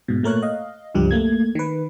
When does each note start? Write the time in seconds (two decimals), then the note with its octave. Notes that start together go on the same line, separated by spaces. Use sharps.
0.08 G#2 B2
0.23 A#2 A3 A#4 C#5 F#6
0.43 D#5 F5
0.94 C#2 G2 F3 G3 G4
1.11 A3 A#3 G#6
1.55 D#3 B4